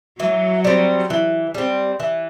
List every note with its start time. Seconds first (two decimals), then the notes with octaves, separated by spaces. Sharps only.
0.20 E3 F#3
0.64 G3 C4
1.10 E3
1.55 G3 C4
2.00 E3